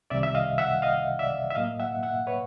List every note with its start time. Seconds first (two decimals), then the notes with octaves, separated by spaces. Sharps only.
0.10 C2 C3 D#3 G3 D5 E5
0.23 E5
0.35 D#5 F5
0.58 E5 F#5
0.82 D#5 F5
1.19 D5 E5
1.50 E5
1.55 A2 F#3 A#3 D#5 F5
1.80 E5 F#5
2.03 E5 F#5
2.27 B4 C#5